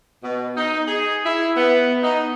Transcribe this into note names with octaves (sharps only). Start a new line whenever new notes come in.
B2
D#4
G#4
E4
B3
D#4